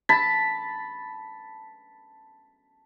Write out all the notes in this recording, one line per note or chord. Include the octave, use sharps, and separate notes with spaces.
A5 B5